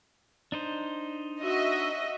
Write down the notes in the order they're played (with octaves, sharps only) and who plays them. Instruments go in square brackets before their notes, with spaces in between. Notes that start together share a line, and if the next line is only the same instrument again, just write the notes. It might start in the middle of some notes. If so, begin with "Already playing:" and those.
[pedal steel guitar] D4 D#4 C5
[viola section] F#4 E5 [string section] D#5